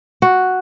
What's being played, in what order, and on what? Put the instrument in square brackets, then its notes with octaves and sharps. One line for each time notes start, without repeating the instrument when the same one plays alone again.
[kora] F#4